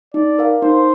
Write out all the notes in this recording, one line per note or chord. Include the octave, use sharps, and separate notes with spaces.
D#4 D5
A#4 F5
D#4 C5